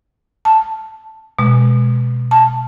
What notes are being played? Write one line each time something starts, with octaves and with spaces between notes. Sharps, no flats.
A5
B2 G#3
A5